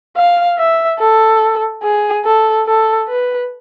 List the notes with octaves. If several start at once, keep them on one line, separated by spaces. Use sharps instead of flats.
F5
E5
A4
G#4
A4
A4
B4